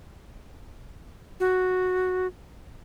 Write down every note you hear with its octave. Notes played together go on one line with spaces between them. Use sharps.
F#4